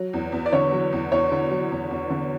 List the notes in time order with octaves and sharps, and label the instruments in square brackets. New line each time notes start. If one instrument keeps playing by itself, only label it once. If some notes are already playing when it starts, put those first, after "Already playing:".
Already playing: [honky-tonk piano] F#3
E2
E2
[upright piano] D5
[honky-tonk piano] D3 [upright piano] C#5
[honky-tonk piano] F#3
E2
[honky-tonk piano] E2 [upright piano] C#5
[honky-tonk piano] D3
F#3
E2
E2
D3